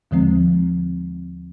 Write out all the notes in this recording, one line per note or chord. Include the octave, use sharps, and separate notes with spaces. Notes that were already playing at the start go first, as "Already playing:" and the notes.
D#2 D3 F3 G#3 C4